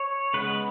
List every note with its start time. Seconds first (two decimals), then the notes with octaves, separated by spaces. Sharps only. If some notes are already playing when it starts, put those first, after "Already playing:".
Already playing: C#5
0.34 C#3 G#3 B3 B4